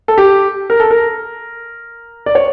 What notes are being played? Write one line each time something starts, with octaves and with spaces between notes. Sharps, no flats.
A4
G4
A#4
A4
A#4
D5
C#5